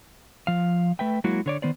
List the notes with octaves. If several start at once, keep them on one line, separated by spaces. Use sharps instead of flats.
F3 F5
A3 B4 E5 G5
F#3 G#3 A#3 E4 F#4
D3 C#5 D5
D#3 B3 C5 D5